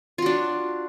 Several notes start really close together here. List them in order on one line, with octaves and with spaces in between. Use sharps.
F4 F#4 D4